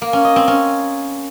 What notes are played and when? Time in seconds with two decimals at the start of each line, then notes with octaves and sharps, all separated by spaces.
0.02 A#3
0.13 C#4
0.25 D#5
0.36 C4
0.48 C#4